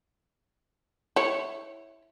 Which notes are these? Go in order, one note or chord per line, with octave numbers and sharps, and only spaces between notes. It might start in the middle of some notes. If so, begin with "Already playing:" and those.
E4 C#5